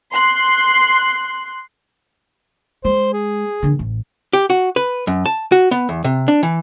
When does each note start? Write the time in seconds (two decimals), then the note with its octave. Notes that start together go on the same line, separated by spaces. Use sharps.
0.12 C6 F#6
2.85 G#3 C5
3.13 G#4
3.62 D3 D#3
3.79 A1
4.33 G4
4.50 F#4
4.76 B4
5.07 F#2
5.26 A5
5.52 F#4
5.71 B3
5.89 E2
6.04 C3
6.28 D4
6.43 E3